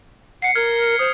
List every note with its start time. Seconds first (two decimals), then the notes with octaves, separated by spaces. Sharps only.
0.42 F#5 C7 C#7
0.55 A#4 F6 G#6
0.99 C5 D#6